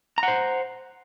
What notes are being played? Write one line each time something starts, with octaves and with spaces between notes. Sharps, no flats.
C5 F#5 A#5